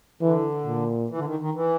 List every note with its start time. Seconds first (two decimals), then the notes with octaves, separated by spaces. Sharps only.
0.21 D3 E3
0.66 A#2
1.10 E3
1.18 D3
1.25 D#3
1.40 D#3
1.55 E3